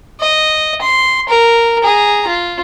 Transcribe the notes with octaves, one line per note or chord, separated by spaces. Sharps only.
D#5
C6
A#4
G#4 A#5
F4